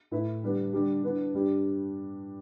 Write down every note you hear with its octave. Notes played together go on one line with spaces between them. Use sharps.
A2 A3 E4 B4 E5
D3 G3 B3 D4
D3 G3 D4 G4
E3 B3 D4
G2 G3 D4 G4